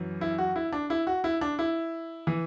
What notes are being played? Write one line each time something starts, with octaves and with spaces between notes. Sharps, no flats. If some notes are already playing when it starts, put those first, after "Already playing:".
Already playing: F#2 E3
E4
F#4
E4
D4
E4
F#4
E4
D4
E4
E3